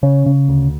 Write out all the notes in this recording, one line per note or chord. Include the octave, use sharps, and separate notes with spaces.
C#3 C#4
C#3
D2